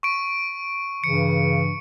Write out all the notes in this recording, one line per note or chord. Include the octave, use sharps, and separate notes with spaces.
C#6 D7
G2 C#3 E3 C#7